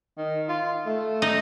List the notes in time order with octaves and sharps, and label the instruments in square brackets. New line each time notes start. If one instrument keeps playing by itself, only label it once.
[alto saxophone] D#3
F4
A3
[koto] D#4